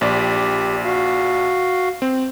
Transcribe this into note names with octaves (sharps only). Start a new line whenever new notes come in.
A#1 G4 D5
F#4 F5
C4